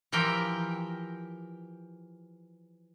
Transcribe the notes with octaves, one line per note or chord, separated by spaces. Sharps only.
E3 F3 G4 A#4 G5